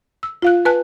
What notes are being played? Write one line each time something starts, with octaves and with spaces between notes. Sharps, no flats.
E6
F4 F5 F#6
B4 G#5 A5 F#6